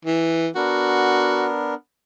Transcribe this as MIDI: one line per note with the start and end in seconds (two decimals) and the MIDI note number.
0.05 0.49 52
0.56 1.74 59
0.56 1.74 62
0.56 1.48 66
0.56 1.74 70